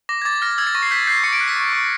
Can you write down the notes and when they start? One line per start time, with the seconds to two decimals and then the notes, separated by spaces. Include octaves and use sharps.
0.09 D6 A#6
0.22 G#6
0.25 D6 A6
0.42 F6 A#6
0.58 E6 G#6
0.67 A6
0.75 C#6 A#6
0.83 C7
0.91 G6 B6
1.07 G6 C7
1.24 C#6 C#7
1.33 D7
1.40 F#6 C7
1.48 B6
1.56 C#6
1.73 C#6